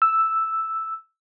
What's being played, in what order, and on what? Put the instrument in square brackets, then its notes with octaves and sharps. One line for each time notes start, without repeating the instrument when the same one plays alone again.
[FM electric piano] E6